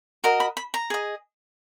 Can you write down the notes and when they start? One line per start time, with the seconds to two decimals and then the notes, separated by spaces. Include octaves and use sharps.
0.24 F#4 A#4 D#5 A#5
0.40 B5
0.57 B5
0.74 A#5
0.90 G#4 D#5